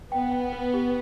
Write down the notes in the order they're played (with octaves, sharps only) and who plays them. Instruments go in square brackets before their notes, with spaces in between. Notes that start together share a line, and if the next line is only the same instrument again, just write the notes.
[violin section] B3 [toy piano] G5
[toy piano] G5
B4
G4